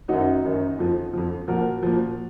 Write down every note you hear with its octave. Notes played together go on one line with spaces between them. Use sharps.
F#2 D#3 F#3 D#4 F#4
F#2 D#3 F#3
F2 F3
F2 F3
A#2 F3 F#4 A#4
A#2 F3